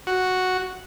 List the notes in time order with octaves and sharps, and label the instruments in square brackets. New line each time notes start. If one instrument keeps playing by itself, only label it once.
[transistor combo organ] F#4